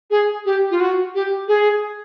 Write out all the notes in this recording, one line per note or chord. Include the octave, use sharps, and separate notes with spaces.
G#4
G4
F4
F#4
G4
G#4